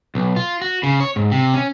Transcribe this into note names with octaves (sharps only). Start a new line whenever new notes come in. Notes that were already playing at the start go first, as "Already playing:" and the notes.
B1
F4
F#4
C#3
C#5
G#2
C3
C#4